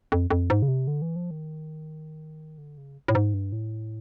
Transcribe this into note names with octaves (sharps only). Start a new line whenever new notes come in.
F2
F2
G#2
C#3
C3
D3
E3
F3
D#3
D3
C#3
A2
G#2
G2
A2